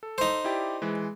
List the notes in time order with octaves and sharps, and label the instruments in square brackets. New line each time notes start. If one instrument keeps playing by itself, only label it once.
[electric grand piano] A4
[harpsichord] D#4 C5
[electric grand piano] E4 G4 D5
E3 G#3